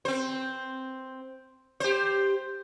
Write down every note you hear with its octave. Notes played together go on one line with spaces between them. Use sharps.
C4 C5
G4 C5